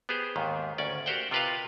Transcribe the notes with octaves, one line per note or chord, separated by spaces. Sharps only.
B3 G4 G#4 C5
D#2 G#2 D#3
D2 C#4 D5
F#4 G4 A#4 C5 F#5 G5
C3 F4 A#4 B4 D#5 F5